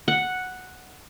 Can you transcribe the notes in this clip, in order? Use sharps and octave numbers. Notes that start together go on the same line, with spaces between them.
F#5